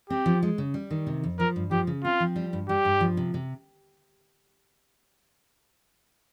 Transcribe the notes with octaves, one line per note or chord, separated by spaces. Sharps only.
C4 G4
F3
G#3
C#3
G3
D#3
C3
F2
F3 A#4
G2
F3 G4
C#3
C4 F4
F3
G3
G2
G3 G4
G2
F3
C3
C3